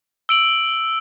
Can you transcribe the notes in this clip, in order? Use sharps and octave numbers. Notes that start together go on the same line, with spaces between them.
E6 D7 F#7